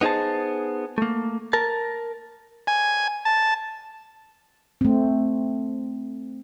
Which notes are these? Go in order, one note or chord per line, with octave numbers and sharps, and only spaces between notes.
B3 D#4 G#4 C5 A5
A3 A#3
A#4 A5
G#5
A5
A3 C4